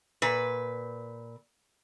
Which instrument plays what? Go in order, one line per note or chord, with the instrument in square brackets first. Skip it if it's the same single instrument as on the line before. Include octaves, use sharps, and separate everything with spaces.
[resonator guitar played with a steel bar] A#2 B4